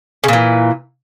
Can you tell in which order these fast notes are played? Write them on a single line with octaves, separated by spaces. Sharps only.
C#3 A#2 E3